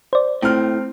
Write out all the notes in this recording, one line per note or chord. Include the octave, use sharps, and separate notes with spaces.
C5 D5
A2 C4 F6